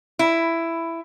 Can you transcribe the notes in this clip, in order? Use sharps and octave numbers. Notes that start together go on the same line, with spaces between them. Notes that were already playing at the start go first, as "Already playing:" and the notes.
E4